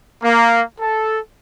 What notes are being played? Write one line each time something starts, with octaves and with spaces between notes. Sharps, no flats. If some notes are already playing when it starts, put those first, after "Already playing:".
A#3
A4